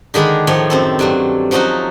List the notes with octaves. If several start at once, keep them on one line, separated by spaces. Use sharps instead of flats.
D3 D#3 G#3 D4 B5
A2 D#3 F3 C#5
F#2 C4 A4
G2 F#3 A3
F3 F#3 C#4 D#4 F#4